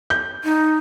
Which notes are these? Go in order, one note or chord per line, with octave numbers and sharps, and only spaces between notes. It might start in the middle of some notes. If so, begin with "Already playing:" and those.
G6
D#4